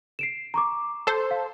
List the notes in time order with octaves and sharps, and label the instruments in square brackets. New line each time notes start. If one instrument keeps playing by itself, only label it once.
[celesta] C7 D7 E7
A#5 C#6 D6
[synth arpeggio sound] A4 C5
[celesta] F5